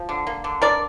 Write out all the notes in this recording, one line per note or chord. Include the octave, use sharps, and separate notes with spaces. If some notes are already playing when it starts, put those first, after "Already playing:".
Already playing: F3
D3
A#3
D3
D4 A#4 D5